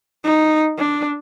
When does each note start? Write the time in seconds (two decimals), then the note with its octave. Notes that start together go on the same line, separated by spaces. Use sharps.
0.24 D#4
0.78 D4